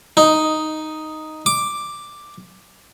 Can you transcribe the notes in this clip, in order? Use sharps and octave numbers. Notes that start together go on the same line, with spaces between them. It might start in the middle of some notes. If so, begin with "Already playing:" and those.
D#4
D6